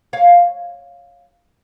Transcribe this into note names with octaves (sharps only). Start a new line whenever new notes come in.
C#5 F5